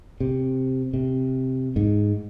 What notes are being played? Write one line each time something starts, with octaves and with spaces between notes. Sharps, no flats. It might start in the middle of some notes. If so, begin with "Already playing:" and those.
C3
C3
G#2